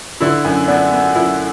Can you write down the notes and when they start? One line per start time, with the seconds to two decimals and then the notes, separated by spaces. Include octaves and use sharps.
0.21 D3 E4
0.44 F#2
0.68 B3 D4
0.92 B3
1.14 F#2 E4